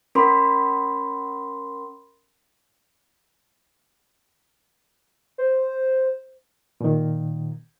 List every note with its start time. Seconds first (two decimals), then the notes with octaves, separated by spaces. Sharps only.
0.15 C#4 A#4 B5 C6
5.38 C5
6.81 A#2 D#3